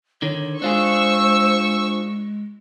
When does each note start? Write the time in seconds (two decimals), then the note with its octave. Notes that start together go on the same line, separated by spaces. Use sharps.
0.22 D3 D#3 C#5
0.62 G#3 D4 F4 G#4 C5 C#6 E6